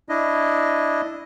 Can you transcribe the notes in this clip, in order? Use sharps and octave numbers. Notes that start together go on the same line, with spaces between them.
D4 E4 D#5